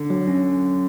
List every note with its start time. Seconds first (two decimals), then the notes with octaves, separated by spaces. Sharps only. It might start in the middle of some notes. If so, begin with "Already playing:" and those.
Already playing: D3
0.10 F#3
0.28 C#4